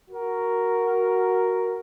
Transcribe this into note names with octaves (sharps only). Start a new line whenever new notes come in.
F#4 A#4